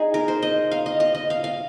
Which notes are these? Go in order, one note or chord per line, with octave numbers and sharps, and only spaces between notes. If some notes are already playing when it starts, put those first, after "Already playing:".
Already playing: D#4 G#4
A#4
C5
D#5
F5
D#5
D#5
D#5
F5
F5